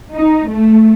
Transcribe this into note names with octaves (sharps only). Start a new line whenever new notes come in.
D#4
A3